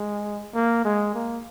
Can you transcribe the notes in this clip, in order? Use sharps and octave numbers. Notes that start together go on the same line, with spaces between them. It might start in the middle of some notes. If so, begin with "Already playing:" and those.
Already playing: G#3
A#3
G#3
A#3